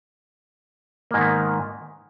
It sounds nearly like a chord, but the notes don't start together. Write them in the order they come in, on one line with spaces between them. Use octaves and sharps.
A#3 G#2 D#3 B3